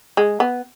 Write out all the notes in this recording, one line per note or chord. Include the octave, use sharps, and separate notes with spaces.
G#3
B3